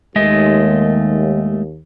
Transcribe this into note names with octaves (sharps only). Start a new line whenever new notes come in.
D#2 G#3 A3 D#5